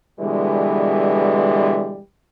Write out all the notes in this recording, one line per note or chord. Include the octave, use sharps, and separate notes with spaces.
B2 D3 E3 G3 G#3